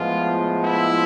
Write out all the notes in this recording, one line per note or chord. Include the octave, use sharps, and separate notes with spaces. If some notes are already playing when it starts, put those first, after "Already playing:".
Already playing: A2 F3 G#3 B3 F4
E4